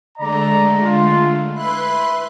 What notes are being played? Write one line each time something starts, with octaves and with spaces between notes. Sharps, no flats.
D3 G#3 A3 D5 A#5
F4
E4 B4 B5 C6 F#6